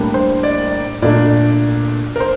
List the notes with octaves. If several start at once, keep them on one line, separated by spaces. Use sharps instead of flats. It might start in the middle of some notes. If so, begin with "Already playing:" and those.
Already playing: A2 G3 A#3 D4
C5
D5
A#2 A3 D4 D5
A#4
C5